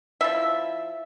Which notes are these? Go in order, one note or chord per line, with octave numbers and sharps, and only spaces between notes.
F3 E4 E5